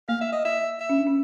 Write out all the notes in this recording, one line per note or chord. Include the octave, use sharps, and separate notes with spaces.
A#3 F5
E5
D#5
E5
E5
C#4
D4
C#4